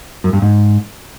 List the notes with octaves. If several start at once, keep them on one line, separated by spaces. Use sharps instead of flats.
F#2
G2
G#2